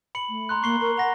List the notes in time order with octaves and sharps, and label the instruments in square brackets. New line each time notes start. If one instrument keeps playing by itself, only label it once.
[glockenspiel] B5 C#7 F#7
[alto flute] A3
[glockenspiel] A#5 C6 F#6
[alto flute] A#3 [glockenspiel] C#6 C7 G7
[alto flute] A#4 [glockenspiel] A#5 C#6
[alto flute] F#5 [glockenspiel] A#5 A#6